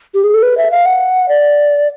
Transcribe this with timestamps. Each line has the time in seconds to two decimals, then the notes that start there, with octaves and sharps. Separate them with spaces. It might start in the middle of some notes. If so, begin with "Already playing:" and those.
0.14 G4
0.24 G#4
0.34 A4
0.42 B4
0.57 E5
0.71 F5
0.86 F#5
1.28 D5